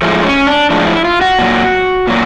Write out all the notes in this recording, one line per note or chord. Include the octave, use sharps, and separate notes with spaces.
A2 F3 G#3 A3
C#4
D4
A2 F3 G#3 D4
E4
F4
F#4
A#2 F#3
A#2 F#3